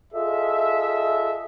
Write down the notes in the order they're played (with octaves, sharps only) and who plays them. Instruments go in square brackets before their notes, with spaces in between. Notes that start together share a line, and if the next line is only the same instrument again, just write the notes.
[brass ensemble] F4 G#4 A4 D#5 E5